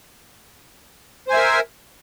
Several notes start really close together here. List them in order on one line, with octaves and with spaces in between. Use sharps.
C5 G#5 E5 A#4